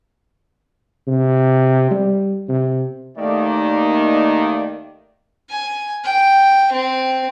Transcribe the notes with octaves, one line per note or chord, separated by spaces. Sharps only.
C3
G3
C3
D#2 D#3 A3 A#3 D#4 D5
G#5
G5
C4